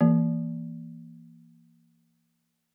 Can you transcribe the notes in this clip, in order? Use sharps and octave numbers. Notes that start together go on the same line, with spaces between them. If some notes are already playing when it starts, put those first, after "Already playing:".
E3 A#3